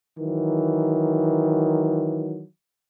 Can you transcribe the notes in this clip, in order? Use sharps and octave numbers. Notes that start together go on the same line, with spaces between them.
D#3 E3 F#3